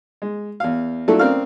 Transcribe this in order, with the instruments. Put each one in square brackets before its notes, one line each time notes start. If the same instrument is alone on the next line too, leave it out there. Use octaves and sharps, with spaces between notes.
[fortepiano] G#3
E2 F5
F#3 A3 D4 E4 F4 A4
C#3 C4 A#4 D5 F5 F6